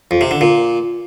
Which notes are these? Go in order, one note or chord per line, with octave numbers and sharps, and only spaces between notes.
F2
C3
D3
A#2